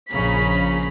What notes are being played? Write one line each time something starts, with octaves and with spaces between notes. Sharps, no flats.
A#1 C#3 C#4 A#5 B5 B6